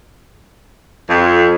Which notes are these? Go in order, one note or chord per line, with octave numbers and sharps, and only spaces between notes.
F2